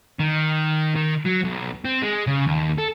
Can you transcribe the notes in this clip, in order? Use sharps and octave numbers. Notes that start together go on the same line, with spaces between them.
D#3
D#3
F#3
B1
C4
G#3
C#3
D#2
A4